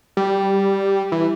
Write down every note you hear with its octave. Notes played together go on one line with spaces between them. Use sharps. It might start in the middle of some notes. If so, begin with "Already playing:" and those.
G3
E3